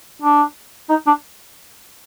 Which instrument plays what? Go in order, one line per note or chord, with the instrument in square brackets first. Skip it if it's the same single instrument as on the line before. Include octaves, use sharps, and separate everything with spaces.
[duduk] D4
D#4
D4